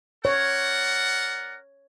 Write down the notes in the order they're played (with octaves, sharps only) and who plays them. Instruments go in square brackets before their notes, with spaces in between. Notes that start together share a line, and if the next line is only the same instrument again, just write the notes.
[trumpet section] A#4 D5 F#5 [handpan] C#5